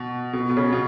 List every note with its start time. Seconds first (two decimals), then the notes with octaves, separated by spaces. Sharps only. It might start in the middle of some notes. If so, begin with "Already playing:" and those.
Already playing: B2
0.33 B2
0.50 B2
0.57 C#3
0.73 B2